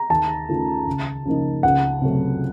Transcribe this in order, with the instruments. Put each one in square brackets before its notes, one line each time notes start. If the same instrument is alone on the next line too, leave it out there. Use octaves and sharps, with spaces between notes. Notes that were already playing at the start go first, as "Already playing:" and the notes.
Already playing: [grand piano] A#5
[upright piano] D#2 [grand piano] A5
[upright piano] D#3 A3 C#4 F4
C#2
C#3 F3 A#3 D#4
[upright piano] C#2 [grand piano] F#5
[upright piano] C3 F#3 A3